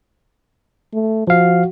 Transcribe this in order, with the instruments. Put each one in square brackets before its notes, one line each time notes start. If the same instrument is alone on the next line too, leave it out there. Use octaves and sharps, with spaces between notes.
[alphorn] A3
[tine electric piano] F3 F5 [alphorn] F#4